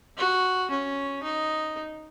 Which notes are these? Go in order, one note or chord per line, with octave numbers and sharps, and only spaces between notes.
F#4
C#4
D#4